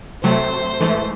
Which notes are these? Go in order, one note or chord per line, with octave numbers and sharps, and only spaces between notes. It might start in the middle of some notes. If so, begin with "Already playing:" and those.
C3 F#3 A3 C5
G#2 E3 A3